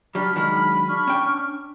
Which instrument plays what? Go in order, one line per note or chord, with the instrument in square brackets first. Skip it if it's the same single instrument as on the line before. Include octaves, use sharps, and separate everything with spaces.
[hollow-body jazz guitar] F#3 G3 [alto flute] D4 [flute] B5 [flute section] F6
[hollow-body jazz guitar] D#3 F#3 G#3
[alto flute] D4 [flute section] C#6 F6
[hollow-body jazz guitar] C#4 G5